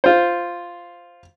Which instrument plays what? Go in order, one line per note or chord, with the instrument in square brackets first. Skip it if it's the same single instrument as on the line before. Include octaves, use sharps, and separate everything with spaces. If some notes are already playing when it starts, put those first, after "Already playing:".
[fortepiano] F4 C5